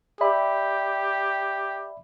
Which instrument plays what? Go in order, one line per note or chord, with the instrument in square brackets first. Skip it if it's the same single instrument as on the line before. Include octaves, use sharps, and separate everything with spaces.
[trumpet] G4 [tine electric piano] D5 E5 B5